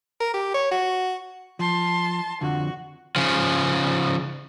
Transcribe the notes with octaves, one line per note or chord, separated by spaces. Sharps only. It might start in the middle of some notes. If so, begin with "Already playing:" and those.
A#4
G4
C#5
F#4
F3 A5 C6
F2 D3 F3 F#4
C#3 F3